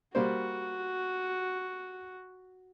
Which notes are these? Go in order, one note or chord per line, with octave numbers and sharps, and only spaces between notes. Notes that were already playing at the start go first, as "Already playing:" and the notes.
G3 A#3 F#4 C5